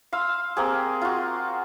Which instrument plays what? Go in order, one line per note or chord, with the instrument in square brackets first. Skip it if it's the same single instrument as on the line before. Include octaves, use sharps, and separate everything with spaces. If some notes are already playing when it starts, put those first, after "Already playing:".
[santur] F5 C6 E6
A#3 C4 G4 G#4
F4 F#4